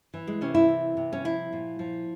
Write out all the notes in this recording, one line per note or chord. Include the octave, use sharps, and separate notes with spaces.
E3
G#3
C3 C#4
E4
E3
C3
C#4
F3 E4
A#2
F3